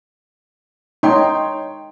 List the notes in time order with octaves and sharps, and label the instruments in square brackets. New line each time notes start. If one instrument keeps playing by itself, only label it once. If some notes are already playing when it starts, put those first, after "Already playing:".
[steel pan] D#4 [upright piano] C#5 G5 C6